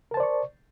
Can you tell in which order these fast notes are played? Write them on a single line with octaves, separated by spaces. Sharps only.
A#4 A5 C5 D5 C#6